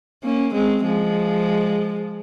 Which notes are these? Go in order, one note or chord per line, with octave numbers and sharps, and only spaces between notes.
A#3 C#4
G#3 C4
F3 G#3